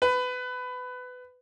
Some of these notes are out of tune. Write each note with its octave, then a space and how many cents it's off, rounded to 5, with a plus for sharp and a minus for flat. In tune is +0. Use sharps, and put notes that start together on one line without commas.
B4 +20